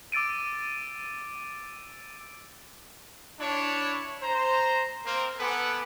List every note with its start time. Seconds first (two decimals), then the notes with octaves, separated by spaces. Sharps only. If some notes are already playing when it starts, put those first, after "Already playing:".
0.12 D6 E6 A6 D7 D#7
3.40 D4 E4 C#5
4.23 C5 A#5
5.05 A#3 C4 A#4
5.39 B3 A4 B4 F#5 G#5 D6